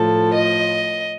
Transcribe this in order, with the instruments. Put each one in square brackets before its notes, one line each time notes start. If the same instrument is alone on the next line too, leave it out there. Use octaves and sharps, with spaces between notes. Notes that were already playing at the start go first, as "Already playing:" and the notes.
Already playing: [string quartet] A2 F3 A4
D#5